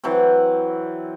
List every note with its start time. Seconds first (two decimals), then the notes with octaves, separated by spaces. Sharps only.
0.04 E3 F#3 C4